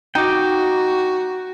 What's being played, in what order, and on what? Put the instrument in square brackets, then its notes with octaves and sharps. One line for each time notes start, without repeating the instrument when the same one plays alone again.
[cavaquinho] D#4 [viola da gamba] F#4 [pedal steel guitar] G5 D6